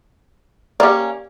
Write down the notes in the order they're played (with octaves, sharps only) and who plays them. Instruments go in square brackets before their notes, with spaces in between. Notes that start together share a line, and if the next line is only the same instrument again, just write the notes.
[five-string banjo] A#3 C#4 [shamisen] G4 D5